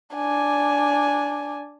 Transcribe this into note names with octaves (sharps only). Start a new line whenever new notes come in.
D4 G#5